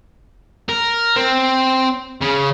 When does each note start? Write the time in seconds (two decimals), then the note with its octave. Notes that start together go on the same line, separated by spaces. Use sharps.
0.69 A#4
1.16 C4
2.22 C#3